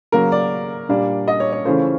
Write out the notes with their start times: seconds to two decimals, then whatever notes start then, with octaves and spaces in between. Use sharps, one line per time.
0.12 C#3 F#3 A#3 A#4
0.32 D5
0.89 A#2 G3 A#3 D4
1.28 D#5
1.40 C#5
1.52 C#5
1.65 C#3 E3 A3 C#4 F4 C5